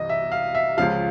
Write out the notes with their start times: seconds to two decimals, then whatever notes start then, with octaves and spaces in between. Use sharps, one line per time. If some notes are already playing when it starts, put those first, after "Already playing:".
Already playing: C2 C3 E3 D#5
0.10 E5
0.32 F5
0.55 E5
0.77 C#2 C#3 F3 F5